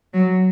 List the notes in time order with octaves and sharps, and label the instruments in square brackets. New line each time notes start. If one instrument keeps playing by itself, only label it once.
[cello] F#3